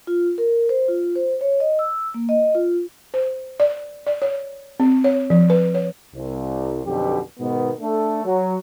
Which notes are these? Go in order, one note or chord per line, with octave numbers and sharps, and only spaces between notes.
F4
A#4
C5
F4
C5
C#5
D#5
E6
A#3
D#5
F4
C5
D5
D5
C#5
C4
C#5
F3
B4
C#5
C2
B1 F2 B2 D3 G4
G#2 B2 D#3 B3
A3 D4 A4
F#3